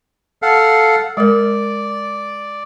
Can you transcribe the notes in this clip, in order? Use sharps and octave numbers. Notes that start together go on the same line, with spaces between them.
A4 F5 F#5
G#3 A#4 D5